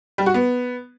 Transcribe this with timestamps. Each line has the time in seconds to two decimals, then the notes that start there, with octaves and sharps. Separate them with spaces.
0.18 G3
0.26 F#4
0.34 B3